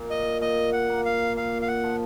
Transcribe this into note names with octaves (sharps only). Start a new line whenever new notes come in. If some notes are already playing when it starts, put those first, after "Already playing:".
Already playing: A#2
D#5
A#2 D#5
F#5
A#3
F5
A#2 F5
F5
F#5
F3